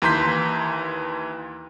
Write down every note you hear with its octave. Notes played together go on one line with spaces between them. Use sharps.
D#2 E3 A#5 C6 G6 B6